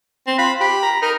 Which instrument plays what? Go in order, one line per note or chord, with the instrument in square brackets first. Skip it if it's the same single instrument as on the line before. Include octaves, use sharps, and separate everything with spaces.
[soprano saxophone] C4
[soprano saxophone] F4 [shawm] B5
[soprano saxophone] G4 [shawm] B5
[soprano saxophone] A#5
[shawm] D#4 [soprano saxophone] A#4